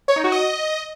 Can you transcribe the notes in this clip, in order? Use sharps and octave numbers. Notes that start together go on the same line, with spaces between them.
C#5
D#4
F#4
D#5